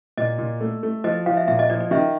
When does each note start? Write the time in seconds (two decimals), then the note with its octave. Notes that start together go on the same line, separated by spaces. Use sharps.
0.17 A#2 D#5
0.38 A#2
0.61 A3
0.83 A3
1.04 F3 D#5
1.26 F3 F5
1.37 E5
1.48 A#2 E5
1.59 D#5
1.70 F3 D5
1.80 D5
1.91 D#3 E5